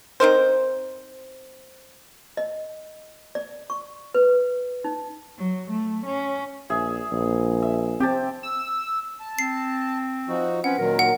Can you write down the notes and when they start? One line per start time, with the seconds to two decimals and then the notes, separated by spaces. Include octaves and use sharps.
0.20 C4 D#4 A#4 C5
2.37 D#5
3.35 D5
3.70 C#6
4.14 B4
4.84 D#4
5.38 F#3
5.71 A3
6.06 C#4
6.70 A#1 G#4 E5
7.12 A#1
7.62 E5
8.00 C4 G4 A5
8.43 E6
9.20 A5
9.39 C4 C7
10.29 F3 D#4 F#4
10.64 C4 C#4 B4 F#5
10.78 A#2 D#3 F#3 A#4
10.99 F#5